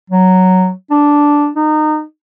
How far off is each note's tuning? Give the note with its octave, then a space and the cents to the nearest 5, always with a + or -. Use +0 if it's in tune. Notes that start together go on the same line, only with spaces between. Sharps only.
F#3 +0
D4 -5
D#4 -25